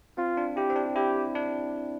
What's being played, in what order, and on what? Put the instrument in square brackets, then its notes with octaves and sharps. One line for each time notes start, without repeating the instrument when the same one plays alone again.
[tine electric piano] C4 [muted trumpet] F4
[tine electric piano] D4
[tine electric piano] E4 [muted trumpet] G4
[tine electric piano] C4
D4
[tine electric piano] E4 [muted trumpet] G4
[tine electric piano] D4